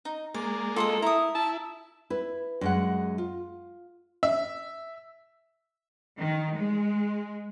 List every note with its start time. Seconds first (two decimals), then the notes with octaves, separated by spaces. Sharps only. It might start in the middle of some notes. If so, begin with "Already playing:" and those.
0.05 D#4
0.34 G#3 A#3 D5
0.76 F4 A4 D#5 D#6
1.02 E4 A#5 D#6
1.35 E4 A5
2.10 E4 B4
2.61 F#2 G#3 F#5
3.18 F4
4.23 E5
6.19 D#3
6.54 G#3